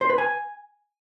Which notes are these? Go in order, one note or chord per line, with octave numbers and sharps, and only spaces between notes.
C5
B4
G#5